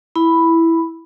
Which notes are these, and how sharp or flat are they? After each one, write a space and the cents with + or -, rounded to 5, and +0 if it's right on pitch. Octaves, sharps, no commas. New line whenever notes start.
E4 +0 B5 +0